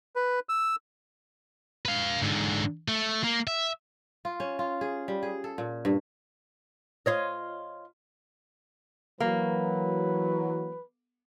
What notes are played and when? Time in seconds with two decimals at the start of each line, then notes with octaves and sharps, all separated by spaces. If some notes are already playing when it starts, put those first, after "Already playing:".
0.16 B4
0.49 E6
1.85 B4 F5
2.22 G#2 D3
2.88 A3
3.24 A#3
3.47 E5
4.25 F4
4.40 C#4
4.59 F4
4.81 G#4
5.08 G3
5.23 G#4
5.44 A4
5.58 A#2
5.85 G2
7.06 F4 C#5 D#5
9.20 E3 F#3 A#3 B4